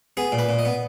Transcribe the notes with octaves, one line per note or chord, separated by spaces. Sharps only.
B3 G#4
A#2
B4
A#2
D#5
B3